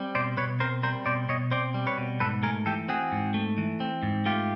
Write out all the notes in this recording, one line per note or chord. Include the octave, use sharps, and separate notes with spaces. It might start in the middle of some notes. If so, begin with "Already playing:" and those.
Already playing: G3 C4
B2 C5 D5
B2 B4 C#5
C4 A#4 C5
G3 A#4 C5
B2 C5 D5
B2 C#5 D#5
C4 C5 D5
G3
B4 C#5
B2
G#2 A4 B4
A3 G#4 A#4
E3 G4 A4
C4 F#4 G#4
G#2
A3
E3
C4
G#2
A3 F4 G4